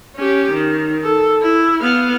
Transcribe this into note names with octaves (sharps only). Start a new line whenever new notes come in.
C#4 G4
D#3
A4
E4
B3 F5